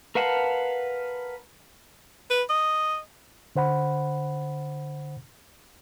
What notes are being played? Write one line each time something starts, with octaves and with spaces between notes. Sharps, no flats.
A#4 B4 F5 F#5 A5
B4
D#5
D3 C5 F#5 B5